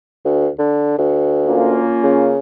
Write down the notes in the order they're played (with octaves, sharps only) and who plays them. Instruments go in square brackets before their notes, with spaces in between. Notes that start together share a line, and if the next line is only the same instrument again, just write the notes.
[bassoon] D2
D3
D2
[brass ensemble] A#3 C#4 F4
[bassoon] C#3